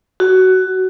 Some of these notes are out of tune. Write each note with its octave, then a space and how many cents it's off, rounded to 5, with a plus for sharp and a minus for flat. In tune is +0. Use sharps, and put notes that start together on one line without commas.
F#4 +15